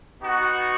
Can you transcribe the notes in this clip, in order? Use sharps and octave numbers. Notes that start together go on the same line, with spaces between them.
B3 D#4 F#4